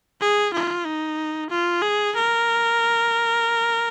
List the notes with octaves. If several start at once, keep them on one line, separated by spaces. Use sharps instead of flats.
G#4
F4
D#4
F4
G#4
A#4